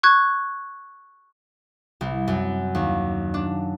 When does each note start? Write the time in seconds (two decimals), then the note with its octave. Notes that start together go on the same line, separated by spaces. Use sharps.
0.03 C#6 F#6 G#6
2.01 C2
2.28 F#2
2.75 D#2
3.34 D4